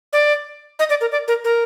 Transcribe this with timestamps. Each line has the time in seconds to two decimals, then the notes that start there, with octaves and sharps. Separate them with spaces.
0.13 D5
0.79 D#5
0.90 D5
1.01 A#4
1.12 D5
1.28 A#4
1.44 A#4